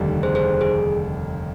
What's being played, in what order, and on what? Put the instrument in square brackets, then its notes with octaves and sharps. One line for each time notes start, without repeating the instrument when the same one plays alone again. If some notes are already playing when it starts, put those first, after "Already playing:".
Already playing: [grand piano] F1 D#2 D3 G3
[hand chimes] G#4 C5
G#4 C5
G#4